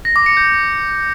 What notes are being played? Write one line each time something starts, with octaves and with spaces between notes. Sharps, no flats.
A#6
D6
C#7
G6